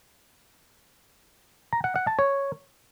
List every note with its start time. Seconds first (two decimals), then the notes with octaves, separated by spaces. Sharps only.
1.73 A#5
1.84 F#5
1.96 F#5
2.07 A5
2.19 C#5